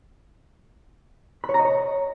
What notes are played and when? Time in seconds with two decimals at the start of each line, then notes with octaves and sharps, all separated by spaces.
1.44 B5
1.49 C#5
1.54 A#5
1.60 D#5
1.65 C#5